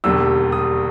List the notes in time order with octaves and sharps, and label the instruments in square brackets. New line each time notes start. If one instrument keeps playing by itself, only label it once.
[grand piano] E1 D#2 D3 G3 E6
D#6